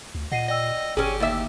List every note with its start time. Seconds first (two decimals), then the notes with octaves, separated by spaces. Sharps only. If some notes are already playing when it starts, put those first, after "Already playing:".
0.15 D2
0.32 A#2 D#5 F#5 C7 D#7
0.48 D5 D#5 G5 E6
0.97 G1 C#4 G4 G#4
1.20 D#2 E5